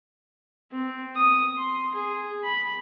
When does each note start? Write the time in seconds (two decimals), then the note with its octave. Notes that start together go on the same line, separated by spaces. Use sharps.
0.71 C4
1.15 D#6
1.57 C6
1.94 G#4
2.44 B5